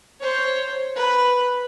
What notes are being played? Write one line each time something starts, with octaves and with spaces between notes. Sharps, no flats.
C5 C#5
B4